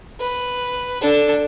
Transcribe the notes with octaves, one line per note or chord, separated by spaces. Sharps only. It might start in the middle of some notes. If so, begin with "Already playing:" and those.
B4
D4 A4